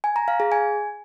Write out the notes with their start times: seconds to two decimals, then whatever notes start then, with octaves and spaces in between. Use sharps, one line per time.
0.04 G#5
0.16 A#5
0.28 F5
0.40 G#4
0.52 G#5